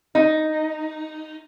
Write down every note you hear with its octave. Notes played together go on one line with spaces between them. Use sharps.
D#4